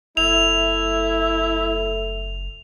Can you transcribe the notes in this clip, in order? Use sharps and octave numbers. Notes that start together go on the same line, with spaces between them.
F#1 A3 E4 F7